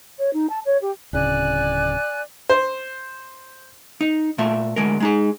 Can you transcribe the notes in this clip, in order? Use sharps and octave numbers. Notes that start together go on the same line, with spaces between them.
C#5
D#4
A5
C#5
G4
D1 C#3 D5 G#5 F#6
C5
D#4
A#2 A3 E5
D2 G#3 A#4
G#3 D#4 G#4